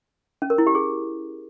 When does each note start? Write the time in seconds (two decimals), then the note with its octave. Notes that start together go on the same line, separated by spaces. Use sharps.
0.42 C#4
0.50 A#4
0.58 E4
0.67 G4
0.75 G#4